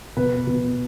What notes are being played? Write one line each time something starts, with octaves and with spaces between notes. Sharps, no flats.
B2 B4
B2